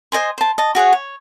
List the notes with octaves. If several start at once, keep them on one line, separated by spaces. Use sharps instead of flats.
C5 D#5 G#5 C6
C5 A5
D#5 A5
F#4 G#4 C#5 F#5
C#5